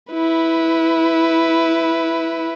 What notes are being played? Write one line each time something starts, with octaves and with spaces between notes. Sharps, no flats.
E4 B4